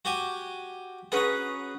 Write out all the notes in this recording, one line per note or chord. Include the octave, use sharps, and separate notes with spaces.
F#4 G4 G#5
C#4 F#4 G#4 B4 A#5